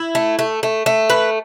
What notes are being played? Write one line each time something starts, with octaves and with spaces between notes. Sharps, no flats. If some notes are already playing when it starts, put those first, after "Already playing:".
Already playing: E4
A3
A3
A3
A3
B4